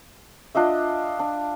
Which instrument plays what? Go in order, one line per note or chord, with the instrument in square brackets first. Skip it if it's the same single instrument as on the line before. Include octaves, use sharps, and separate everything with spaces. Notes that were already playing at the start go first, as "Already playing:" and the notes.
[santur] D4 F4 D#5 E5
D4